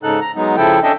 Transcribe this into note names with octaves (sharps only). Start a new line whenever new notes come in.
G#2 C#3 D#4 A4 F#6
A#5
F#3 G#3 B3 D#4
C#3 F3 E4 A4 G5
C#4 D4 A4 D#5 E5 G5